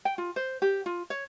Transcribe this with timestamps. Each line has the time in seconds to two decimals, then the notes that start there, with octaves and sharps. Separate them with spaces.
0.05 G5
0.18 F4
0.36 C5
0.62 G4
0.86 F4
1.10 C#5